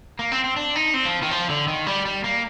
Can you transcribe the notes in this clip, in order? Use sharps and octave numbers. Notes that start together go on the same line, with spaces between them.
A#3
C4
C4
D4
D#4
C4
F3
D#3
F3
D3
D#3
G3
G3
A#3